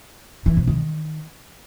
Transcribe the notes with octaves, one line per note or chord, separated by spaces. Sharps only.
E3
C3
D#3